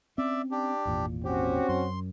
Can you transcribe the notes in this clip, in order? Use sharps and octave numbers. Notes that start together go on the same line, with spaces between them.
C4 C#4 D5 E5
D4 G4
G#1 E2 A#2
C4 C#4 F#4 G4
F#2 C6